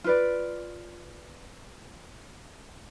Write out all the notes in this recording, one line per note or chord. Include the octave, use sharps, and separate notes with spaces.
F4 B4 D5